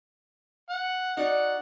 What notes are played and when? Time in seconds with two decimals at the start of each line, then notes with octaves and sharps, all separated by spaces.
0.70 F#5
1.17 D#4 F#4 D5 F#5